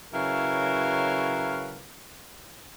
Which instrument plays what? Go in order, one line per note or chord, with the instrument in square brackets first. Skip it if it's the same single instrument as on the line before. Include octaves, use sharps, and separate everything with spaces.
[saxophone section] C#3 F#3 E4 A#4 B4 F5